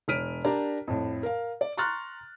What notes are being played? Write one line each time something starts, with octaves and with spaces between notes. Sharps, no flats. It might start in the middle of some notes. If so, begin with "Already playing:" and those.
E1 C#5 F6 B6 D7 D#7
D4 G4 A#4 D5 A5 A#5
F2 A2
A#4 F5
D5
A#5 C6 C#6 F6 F#6 A6